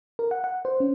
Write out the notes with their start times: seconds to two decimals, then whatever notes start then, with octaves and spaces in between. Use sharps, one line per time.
0.19 A#4
0.31 F#5
0.44 F#5
0.65 C5
0.80 C#4